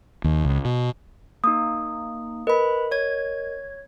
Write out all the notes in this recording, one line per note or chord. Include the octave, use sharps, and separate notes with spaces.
D#2
C#2
B2
A#3 D#4 D#6
A#4 B4 D#5 B5
C#5 G#6